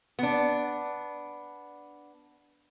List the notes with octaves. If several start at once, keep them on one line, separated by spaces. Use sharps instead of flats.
B3 D4